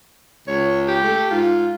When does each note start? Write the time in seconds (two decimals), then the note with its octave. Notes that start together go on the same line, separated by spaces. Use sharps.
0.48 C#2 C#5
0.88 G4
1.03 A3
1.31 G#2 F4